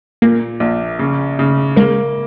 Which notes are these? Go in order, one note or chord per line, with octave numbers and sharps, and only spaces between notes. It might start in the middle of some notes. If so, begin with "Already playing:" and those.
A#2 A#3
A#1
C#3
C#3
G#3 A#3